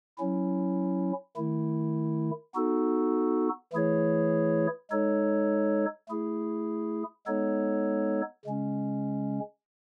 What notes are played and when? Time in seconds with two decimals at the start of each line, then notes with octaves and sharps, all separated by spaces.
0.18 F#3 C#4 E4
1.36 D#3 A3 E4
2.55 B3 D#4 F#4 A4
3.73 E3 A3 E4 G#4 C#5
4.91 G#3 D#4 A4 C#5
6.09 A3 E4 G#4
7.27 G#3 B3 D#4 A4 C#5
8.45 C#3 G#3 C#4